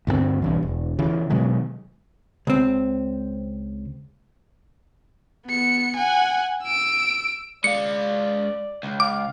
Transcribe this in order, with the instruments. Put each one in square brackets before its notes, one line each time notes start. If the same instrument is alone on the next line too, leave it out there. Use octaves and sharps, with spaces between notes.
[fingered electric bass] D2 G2 G3 C4
B1 G2 E3
E1
C#3 E3
B2 D#3 F#3 G#3
[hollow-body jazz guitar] C#2 C4
[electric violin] B3 C#7
F#5 G#5
E6 D7
[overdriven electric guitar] G#3 F5 [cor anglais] D5 [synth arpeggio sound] C#7
[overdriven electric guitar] C#2
[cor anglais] F5 [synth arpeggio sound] D6